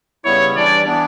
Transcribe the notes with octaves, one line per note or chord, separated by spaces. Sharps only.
C#3 G3 B3 E4 C#5
E3 G3 D4 D5
E3 B3 D4